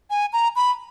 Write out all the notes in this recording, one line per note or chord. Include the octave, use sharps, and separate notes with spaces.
G#5
A#5
B5